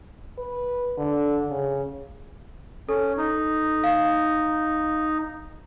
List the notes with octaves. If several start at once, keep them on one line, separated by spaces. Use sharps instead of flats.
B4
D3
C#3
C#4 A4
D#4
F5